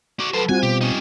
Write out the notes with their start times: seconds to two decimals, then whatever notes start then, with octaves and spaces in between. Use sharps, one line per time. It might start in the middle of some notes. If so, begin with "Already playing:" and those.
0.20 F#4 D5
0.33 F#3 A4 B4 C5
0.49 G3 C4 F4 F#4 G#5
0.63 B2 G4
0.81 C#4 D#4